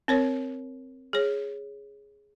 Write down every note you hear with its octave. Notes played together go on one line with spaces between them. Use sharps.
C4 A#4 C#5
G#4 C#5